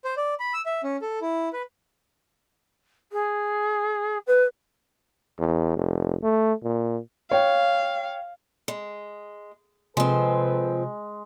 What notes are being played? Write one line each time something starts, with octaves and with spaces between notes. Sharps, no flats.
C5
D5
B5
E6
E5
C#4
A4
E4
B4
G#4
B4
E2
F1
A3
A#2
C#5 F5 G5
G#3
C3 F3 G#3 C4 G#4 A4 B4